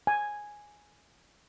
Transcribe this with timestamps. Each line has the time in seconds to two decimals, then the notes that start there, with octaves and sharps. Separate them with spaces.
0.07 G#5